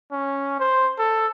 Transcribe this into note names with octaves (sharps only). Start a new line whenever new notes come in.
C#4
C5
A4